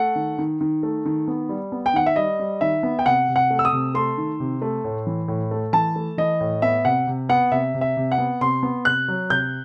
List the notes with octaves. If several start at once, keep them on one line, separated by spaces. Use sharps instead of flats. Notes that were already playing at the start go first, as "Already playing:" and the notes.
Already playing: A3 F#5
D#3
D#3
D#3
A3
D#3
B3
G3
B3
G5
D#3 F#5
E5
G3 D#5
G3
D#3 E5
B3
G5
C3 F#5
C3
F#5
A3
E6
D#6
C3
A3 C6
D#3
C3
A3
A2
E3
A2
A3
E3 A5
A3
E3 D#5
A2
B3 E5
C3 F#5
C3
B3 F#5
C3 E5
C3
E5
C3
F#5
B3
C3 C6
B3
C3 F#6
F#3
C3 G6